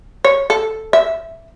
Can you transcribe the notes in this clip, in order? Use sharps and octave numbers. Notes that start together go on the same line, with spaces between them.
C#5
A4
E5